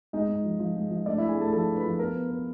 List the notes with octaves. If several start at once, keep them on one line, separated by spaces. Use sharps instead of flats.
G#3 D#4 D#5
G#3
F3
F3
G#3
F3
A3 D4 D5
D4 E4 E5
G#4 G#5
A3 A4 A5
F3 A4 A5
D4
B4 B5
F3
B3 A#4 A#5
B3
B3